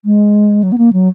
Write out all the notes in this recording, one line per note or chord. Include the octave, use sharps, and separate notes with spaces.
G#3
F#3
B3
A#3
F#3